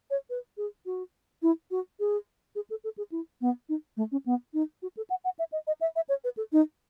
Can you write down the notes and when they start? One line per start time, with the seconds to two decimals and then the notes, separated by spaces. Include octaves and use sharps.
0.11 C#5
0.30 B4
0.57 G#4
0.86 F#4
1.42 E4
1.71 F#4
2.00 G#4
2.55 G#4
2.70 A4
2.84 A4
2.98 G#4
3.12 E4
3.41 B3
3.69 D#4
3.97 A3
4.12 C#4
4.26 B3
4.54 D#4
4.83 F#4
4.97 A4
5.10 F#5
5.24 F#5
5.39 E5
5.52 D#5
5.67 D#5
5.81 E5
5.96 E5
6.09 C#5
6.24 B4
6.37 A4
6.53 D#4